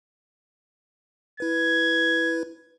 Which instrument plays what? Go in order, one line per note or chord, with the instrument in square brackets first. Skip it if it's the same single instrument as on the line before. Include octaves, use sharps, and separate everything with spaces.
[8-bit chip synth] E4 B4 [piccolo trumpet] G#6